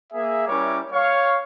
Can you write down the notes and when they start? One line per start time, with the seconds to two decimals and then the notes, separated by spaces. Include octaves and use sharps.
0.13 A#3 G#4 E5
0.48 G3 C#4 E4 A#4 C#5 D6
0.92 C#5 F5 C#6